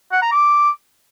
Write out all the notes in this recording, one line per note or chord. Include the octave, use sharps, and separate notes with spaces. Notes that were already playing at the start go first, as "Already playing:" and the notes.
F#5
A#5
D6